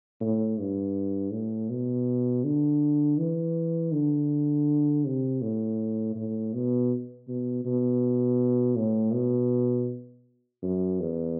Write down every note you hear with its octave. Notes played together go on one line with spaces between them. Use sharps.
A2
G2
A2
B2
D3
E3
D3
C3
A2
A2
B2
B2
B2
A2
B2
F#2
E2